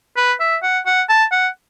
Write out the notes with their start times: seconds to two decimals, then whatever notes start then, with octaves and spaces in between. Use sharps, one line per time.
0.17 B4
0.40 E5
0.63 F#5
0.86 F#5
1.09 A5
1.32 F#5